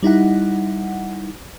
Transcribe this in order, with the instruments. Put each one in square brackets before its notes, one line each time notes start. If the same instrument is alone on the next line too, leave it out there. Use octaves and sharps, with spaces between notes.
[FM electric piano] G3 D#4 E4 F#5